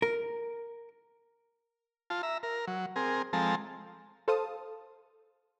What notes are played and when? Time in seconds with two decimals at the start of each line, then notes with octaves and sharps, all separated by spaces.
0.02 A#4
2.10 F4 A5
2.23 E5 A#5
2.43 A#4
2.68 F#3
2.96 C4 G#4 A#4
3.33 F3 G#3 C4 A4 A5 A#5
4.28 A4 C5 F5 A5 D#6